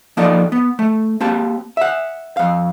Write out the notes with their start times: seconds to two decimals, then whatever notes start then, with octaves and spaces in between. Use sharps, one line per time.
0.17 F3 A#3 D#4 A4 D5
0.52 B3
0.79 A3
1.21 A#3 C4 G4 A5
1.77 E5 F#5
2.37 F2 F5